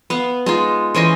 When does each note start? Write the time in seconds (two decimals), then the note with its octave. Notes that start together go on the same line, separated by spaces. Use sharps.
0.10 B3 F5
0.46 G#3 D#4 F4
0.95 E3 C#4 C5 D#5